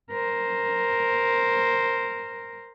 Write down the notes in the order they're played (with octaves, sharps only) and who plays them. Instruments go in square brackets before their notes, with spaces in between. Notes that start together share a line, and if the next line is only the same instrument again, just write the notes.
[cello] A#4 C5